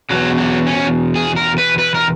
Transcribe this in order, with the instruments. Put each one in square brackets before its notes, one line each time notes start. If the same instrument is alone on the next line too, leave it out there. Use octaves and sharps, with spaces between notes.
[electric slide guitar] E2 B2 F#3
F#3
C#4
G#4
A#4
B4
B4
A#4